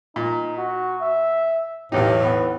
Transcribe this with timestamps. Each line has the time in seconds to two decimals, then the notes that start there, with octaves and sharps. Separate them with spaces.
0.16 A#2 D#4
0.58 F#4
1.01 E5
1.92 B1 E2 A2 D#4 G4
2.23 B3